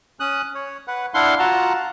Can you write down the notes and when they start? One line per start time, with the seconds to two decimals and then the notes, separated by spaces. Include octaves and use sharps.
0.20 C#4 D#6 F#6
0.55 C#5
0.88 B4 F#5
1.14 D4 E4 F5 F#5 C6
1.39 F4 F#4 F#5 A5 A#5